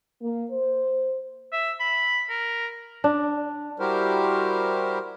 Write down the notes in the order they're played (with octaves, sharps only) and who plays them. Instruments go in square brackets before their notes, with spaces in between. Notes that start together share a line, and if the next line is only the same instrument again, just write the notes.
[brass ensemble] A#3
C5
[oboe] E5
B5
A#4
[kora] D4
[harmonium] G3 E4 F#4 G4 A#4 C5